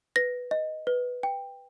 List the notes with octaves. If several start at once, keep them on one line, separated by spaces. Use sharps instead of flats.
B4 A#6
D#5
B4
G5